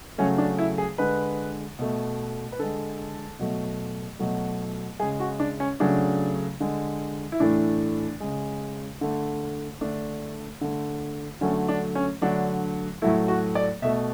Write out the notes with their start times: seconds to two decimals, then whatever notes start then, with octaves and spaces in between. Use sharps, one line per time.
0.18 C#3 F#3 A3 C#4
0.38 D4
0.58 E4
0.78 G#4
0.98 D3 G#3 B4
1.79 B2 A3
2.52 B4
2.59 D3 G#3 A4
3.39 B2 F#3 A3
4.19 B2 F#3 A3
5.00 C#3 G#3 G#4
5.20 F#4
5.40 D4
5.60 C#4
5.80 C#3 F#3 A3 D4
6.60 D3 G#3
7.32 E4
7.40 A2 E3 A3 D4
8.20 C#3 G#3
9.01 D3 A3
9.81 D3 A3 D4
10.61 D3 A3
11.41 D3 F#3 A3 C#4
11.69 D4
11.95 C#4
12.21 D3 F#3 A3 D4
13.02 A2 F#3 A3 E4
13.28 F#4
13.55 D5
13.82 B2 A3 E5